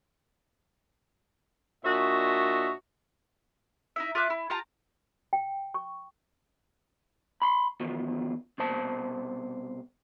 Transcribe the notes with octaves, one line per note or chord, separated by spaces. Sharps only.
A#2 D4 F#4 C#5 D#5 E5
D#4 E4 E5
F4 E5 D6 F#6
E4
F4 G4 A5 A#5
G5
C#6
B5 C6
E2 B2 D#3 F3
C2 B2 C5 A5